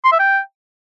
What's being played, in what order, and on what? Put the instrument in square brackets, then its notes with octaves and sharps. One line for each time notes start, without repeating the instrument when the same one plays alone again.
[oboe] C6
E5
G5